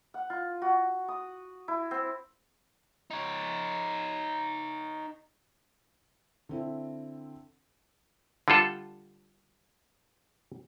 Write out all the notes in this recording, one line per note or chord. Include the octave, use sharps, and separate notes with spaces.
F#5
F4
F#4
D#6
E4
C4
D#4 C#5
D3 C4 E4
D3 G3 F4 A4